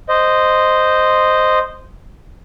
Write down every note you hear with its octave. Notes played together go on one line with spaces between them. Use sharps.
C5 D#5